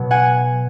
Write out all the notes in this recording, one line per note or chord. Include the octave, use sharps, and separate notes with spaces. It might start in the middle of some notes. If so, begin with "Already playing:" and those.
Already playing: B2 F#3 B3
F#5 G#5